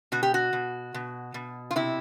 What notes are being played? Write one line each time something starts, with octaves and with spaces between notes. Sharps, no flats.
B2 F#4
G4
F#4
B2
B2
B2
F4
C3 E4